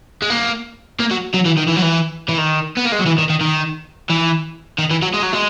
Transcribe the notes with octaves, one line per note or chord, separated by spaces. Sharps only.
G#3
A#3
A#3
F#3
F#3
E3
D#3
E3
F#3
E3
E3
D#3
B3
A#3
G#3
F#3
E3
D#3
D#3
D#3
E3
D#3
E3
F#3
G#3
F#3
G#3